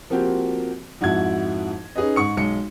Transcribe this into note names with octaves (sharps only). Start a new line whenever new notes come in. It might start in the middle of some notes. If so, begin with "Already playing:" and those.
F3 A#3 C4 F#4 G4
F2 G#2 E4 F#4 G#6
C#4 D#4 G#4 B4 D#5
G#2 C#6 C#7
B1 G#3 C#7